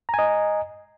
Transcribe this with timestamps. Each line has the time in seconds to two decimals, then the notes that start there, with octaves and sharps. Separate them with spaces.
0.09 A#5
0.14 G#5
0.19 D#5